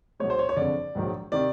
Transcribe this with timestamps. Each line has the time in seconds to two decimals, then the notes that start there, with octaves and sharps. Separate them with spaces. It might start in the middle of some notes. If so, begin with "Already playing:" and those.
0.20 B1 B2 G#3 C#5
0.30 C5
0.39 C#5
0.49 C#5
0.56 F#1 F2 D3 D5
0.95 A#1 G#2 D#3 F#3
1.32 C3 D#3 D5